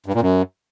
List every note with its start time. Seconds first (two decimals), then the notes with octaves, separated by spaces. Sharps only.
0.06 G2
0.14 A#2
0.21 F#2